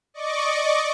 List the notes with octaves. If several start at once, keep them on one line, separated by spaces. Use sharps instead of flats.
D5 D#5 C#6 D6